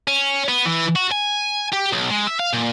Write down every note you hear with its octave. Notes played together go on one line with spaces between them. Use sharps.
C#4
B3
E3
F#4
G#5
G4
B1
G#3
E5
F5
A#2